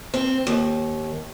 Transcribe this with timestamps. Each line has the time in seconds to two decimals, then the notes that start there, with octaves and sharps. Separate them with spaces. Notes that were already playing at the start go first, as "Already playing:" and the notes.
0.14 C4
0.47 D#2